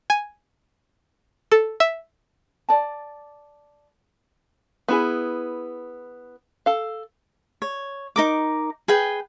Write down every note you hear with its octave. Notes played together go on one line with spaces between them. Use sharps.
G#5
A4
E5
D5 A5
B3 E4 G#4
A4 F5
C#5
D#4 A#4 D6
G#4 B4 G5 G#5